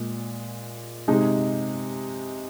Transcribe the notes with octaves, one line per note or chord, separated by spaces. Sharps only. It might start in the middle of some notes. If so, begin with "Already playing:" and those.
Already playing: A#2 G#3
C3 G#3 D#4